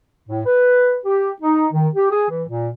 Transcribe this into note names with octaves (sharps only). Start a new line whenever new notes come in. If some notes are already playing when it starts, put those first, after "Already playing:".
A2
B4
G4
D#4
D#3
G4
G#4
E3
A#2